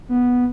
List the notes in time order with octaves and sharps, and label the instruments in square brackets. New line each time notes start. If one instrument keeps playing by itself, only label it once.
[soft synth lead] B3